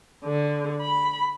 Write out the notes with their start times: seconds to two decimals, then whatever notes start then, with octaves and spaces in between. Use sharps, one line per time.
0.24 D3
0.81 B5